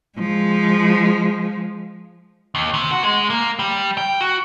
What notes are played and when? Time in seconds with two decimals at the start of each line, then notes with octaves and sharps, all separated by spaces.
0.19 F3 G#3
2.55 D#2
2.74 C3
2.91 F#4
3.03 G#3
3.30 A#3
3.59 G3
3.97 G5
4.21 F#4